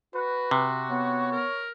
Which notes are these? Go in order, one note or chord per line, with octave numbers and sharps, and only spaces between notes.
F#4 B4
C3
B3 C#5
A#4